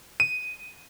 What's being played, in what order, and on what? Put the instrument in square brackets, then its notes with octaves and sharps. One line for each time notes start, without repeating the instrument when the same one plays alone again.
[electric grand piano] D#7